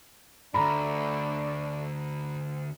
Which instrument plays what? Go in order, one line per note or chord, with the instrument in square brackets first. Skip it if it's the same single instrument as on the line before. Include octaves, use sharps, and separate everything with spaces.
[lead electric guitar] D2 G2 [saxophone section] A3 D4 [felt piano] A#5 B5